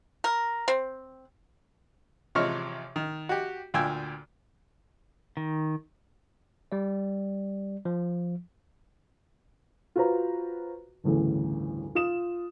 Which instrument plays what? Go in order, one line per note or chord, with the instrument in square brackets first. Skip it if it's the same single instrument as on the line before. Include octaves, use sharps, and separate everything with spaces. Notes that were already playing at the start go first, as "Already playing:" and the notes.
[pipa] A#4
C4
[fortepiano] A1 C3 F3 G#3 C#5 F6
D#3
F#4 G4
D2 A#2 G5 G#5 E6
[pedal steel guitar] D#3
[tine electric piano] G3 D5
F3
[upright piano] F4 F#4 B4 C5 A#5
G1 D2 A2 C#3 E3
F4 D#6 E7